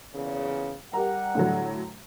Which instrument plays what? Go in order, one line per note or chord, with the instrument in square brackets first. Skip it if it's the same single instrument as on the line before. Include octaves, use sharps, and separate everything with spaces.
[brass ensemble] E2 A#2 C#3
[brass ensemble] G3 F#5 [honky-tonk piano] G4 A#4 A#5
[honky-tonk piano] A2 D3 F#3